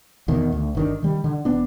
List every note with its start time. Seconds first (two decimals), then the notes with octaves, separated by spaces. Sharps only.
0.28 E2 B2 D#3
0.52 D2
0.75 G1 D#3 D4
1.03 D#3 G3
1.24 D3
1.45 E1 B3 D4